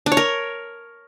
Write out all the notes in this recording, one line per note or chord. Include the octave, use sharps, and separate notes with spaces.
D4
C#5
A#4